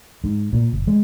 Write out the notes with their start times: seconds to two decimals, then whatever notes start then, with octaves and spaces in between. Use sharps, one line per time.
0.24 G#2
0.53 A#2
0.73 F#1
0.87 G#3